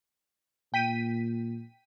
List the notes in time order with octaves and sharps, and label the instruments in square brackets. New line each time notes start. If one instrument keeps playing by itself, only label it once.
[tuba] A#2 [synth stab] G5 B6 D#7